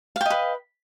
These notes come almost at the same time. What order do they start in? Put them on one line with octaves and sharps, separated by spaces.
F5 G5 D#5 B4